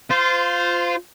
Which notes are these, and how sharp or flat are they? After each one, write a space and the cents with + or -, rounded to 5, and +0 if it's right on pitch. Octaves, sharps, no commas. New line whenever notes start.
F4 +0 C5 -20